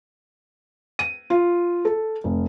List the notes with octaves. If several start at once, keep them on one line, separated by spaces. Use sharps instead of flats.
D#7
F4
A4
F1